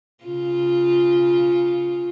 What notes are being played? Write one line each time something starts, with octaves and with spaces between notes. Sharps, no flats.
C#3 F4